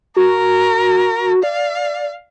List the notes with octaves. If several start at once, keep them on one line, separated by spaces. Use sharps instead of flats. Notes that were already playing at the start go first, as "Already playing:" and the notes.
F#4 A#4
D5 F5